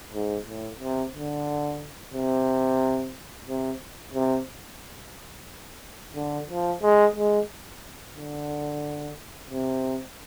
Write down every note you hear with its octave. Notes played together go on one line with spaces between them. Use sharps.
G#2
A2
C3
D3
C3
C3
C3
D3
F3
G#3
G#3
D3
C3